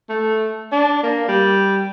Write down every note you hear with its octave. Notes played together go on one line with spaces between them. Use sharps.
A3
D4
A#3
G3